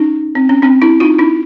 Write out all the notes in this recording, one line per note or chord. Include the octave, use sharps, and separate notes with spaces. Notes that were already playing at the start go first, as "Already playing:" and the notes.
Already playing: C#4 D#4
C4
C#4
C4 D4
D4 E4
D#4 F4
D4 E4